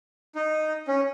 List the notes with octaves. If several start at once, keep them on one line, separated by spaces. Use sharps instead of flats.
D#4
C#4